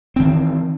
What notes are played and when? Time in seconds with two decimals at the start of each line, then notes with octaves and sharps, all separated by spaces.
0.16 C4
0.20 D#3
0.23 E3